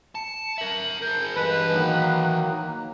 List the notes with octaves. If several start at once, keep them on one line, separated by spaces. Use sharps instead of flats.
A5 C#7
A#4 E5 F#7
G#4 A#4 G6
G2 E3 G#3 B4 A5 F#6
D#3 F#3 A#3 D#4